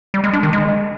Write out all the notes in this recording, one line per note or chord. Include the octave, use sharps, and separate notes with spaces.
G3
G#3
D4
D#3
G#3